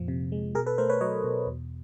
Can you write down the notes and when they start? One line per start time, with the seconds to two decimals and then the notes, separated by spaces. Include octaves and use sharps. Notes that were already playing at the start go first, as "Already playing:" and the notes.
Already playing: F2 A#2 F3
0.08 C3
0.32 G#3
0.55 B2 G#4 A#4
0.66 A4 B4
0.78 A3 A#4 C5
0.89 B4 C#5
1.01 F#3 C#5 D#5
1.24 B2
1.47 E2